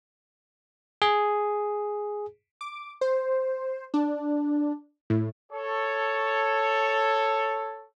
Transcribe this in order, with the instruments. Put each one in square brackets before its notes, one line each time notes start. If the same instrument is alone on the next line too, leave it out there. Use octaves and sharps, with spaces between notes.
[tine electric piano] G#4
[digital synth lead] D6
C5
D4
A2
[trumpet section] A4 C#5